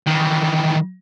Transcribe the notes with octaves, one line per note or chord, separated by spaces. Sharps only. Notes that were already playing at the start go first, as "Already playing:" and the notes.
D#3 E3